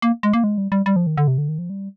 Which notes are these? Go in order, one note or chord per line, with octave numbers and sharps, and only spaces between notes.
A#3
G#3
A#3
G#3
G3
G3
G3
F3
D#3
D3
C3
D3
D#3
F3
G3